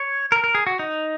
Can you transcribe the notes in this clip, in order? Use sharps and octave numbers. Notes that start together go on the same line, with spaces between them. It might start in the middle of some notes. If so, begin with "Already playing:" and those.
Already playing: C#5
A#4
A#4
G#4
F#4
D#4